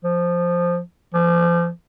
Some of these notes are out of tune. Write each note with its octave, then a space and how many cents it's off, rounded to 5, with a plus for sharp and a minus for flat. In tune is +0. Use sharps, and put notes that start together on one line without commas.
F3 +0
F3 -35